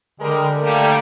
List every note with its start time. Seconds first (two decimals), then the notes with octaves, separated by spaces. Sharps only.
0.20 D3 G3 G#3 A#4
0.62 G3 A3 A#3